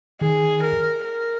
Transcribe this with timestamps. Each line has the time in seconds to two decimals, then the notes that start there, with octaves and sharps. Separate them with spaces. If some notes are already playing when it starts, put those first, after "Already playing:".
0.21 D#3 G#4
0.63 A#4
1.05 A#4